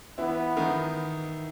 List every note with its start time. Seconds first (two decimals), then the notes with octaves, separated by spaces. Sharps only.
0.18 E3 B3 E4
0.57 D#3 D#4